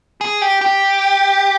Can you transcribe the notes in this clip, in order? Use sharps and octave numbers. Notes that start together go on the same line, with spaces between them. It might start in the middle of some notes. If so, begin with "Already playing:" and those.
G#4
G4
G4